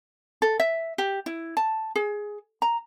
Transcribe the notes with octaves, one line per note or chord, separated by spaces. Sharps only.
A4
E5
G4
E4
A5
G#4
A#5